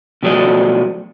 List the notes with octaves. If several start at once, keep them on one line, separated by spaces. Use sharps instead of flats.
B2 F3 F#3 A3 D5 D#5